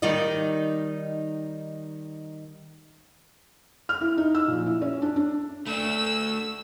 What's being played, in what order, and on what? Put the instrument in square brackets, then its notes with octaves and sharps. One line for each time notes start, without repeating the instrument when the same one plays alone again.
[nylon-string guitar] D#3 G3 D#4 D5 D#5
[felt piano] F6
E4
D#4
E6
A#1
E4
C#4
D4
D4
[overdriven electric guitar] A3 D4 [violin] E6